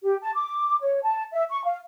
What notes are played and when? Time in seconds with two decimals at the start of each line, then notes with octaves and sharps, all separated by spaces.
0.04 G4
0.22 A5
0.35 D6
0.82 C#5
1.03 A5
1.33 E5
1.50 C#6
1.64 F5